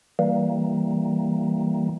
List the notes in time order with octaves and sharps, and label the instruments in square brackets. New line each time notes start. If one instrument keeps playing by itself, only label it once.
[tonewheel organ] E3 G3 A#3